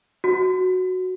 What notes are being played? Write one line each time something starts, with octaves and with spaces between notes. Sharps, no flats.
F#4